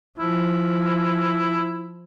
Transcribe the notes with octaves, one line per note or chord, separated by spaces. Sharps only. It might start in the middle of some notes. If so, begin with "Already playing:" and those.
F3 E4